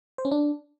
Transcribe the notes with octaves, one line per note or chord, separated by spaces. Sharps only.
C5
C#4
D4